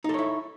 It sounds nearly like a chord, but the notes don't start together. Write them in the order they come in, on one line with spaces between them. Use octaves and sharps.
D#4 A4 C#5 E4